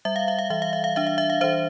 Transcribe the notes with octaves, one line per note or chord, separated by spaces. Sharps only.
G3 E5
F5
E5
F5
E3 E5
F5
E5
F5
D4 E5
F5
E5
F5
E3 C5 E5